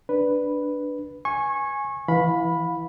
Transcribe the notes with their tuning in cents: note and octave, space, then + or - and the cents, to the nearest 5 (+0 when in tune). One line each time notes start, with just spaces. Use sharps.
D4 +0 B4 +0
G#5 +0 C#6 -25
E3 +0 F5 +35 B5 +0